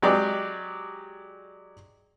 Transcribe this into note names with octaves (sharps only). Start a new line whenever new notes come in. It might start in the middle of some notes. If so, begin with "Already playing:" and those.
F#3 G#3 G4 D5